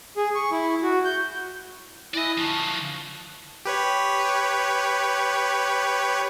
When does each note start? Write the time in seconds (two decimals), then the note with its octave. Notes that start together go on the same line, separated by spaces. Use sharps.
0.17 G#4
0.35 C#6
0.52 E4
0.83 F#4
1.05 G6
2.14 E4 D5 D#5 G#5 F#6
2.38 D3 F3 A5 C#6 F#6
3.65 G4 B4 C#5